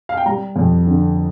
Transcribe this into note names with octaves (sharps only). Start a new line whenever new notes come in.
F5
G5
G3 A#5
F2
D3